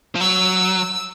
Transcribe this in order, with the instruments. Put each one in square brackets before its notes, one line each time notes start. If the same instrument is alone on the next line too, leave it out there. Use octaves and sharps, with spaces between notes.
[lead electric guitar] F3
[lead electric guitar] F#3 [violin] E6